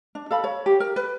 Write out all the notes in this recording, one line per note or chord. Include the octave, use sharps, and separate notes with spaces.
D4
A4 F5 B5
C#5
G4
A#4
B4